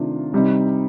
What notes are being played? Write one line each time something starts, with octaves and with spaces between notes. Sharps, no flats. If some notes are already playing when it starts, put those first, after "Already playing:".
Already playing: C3 D#3 A3 D4 F4
C3 G3 C4 D#4